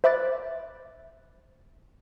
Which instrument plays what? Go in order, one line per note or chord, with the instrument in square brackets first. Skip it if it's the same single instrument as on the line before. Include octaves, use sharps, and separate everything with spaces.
[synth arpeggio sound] C5 E5 B5 D6 F#6 A6